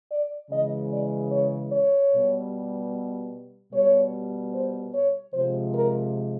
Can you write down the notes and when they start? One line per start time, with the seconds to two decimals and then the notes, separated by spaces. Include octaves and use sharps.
0.10 D5
0.50 C#3 E3 G#3 D#5
0.91 D5
1.31 C#5
1.71 C#5
2.12 B2 G3
3.73 B2 G3 C#5
4.53 C5
4.94 C#5
5.34 C3 F3 G#3 C5
5.74 A#4